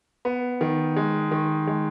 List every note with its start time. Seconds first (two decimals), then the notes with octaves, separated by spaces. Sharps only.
0.25 B3
0.61 D#3
0.96 G#3
1.31 D#3
1.67 G#3